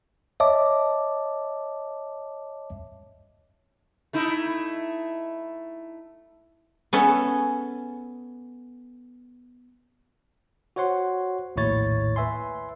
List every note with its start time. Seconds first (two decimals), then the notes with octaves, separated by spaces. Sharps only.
0.40 C#5 D#5 E5 A5 D6
4.13 A3 D#4 E4
6.93 B3 C#4 A4 E5
10.76 F#4 C5 C#5 F#5 C6
11.56 A#1 D#2 A2 E4 C#5 A6
12.16 B4 E5 G#5 C6